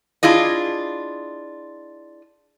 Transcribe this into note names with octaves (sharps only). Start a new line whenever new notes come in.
D4 E4 F4 G#4 D#5